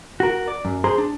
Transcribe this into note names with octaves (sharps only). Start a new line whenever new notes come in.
F#4 A#4
D5
F#2
G#4 C5 A#5 C6
D4